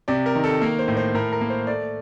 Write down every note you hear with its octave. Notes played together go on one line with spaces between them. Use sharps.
C3 D5
A#4
D#3
A4
A#3 A#4
C5
A2
C5
A2 A#4
A#4
A#3
C5
A3 D5